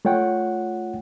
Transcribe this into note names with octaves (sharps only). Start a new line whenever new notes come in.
A3 F4 C#5 F#5 G5